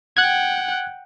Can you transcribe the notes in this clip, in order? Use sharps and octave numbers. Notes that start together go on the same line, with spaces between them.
F#5 G5 F#6 G#6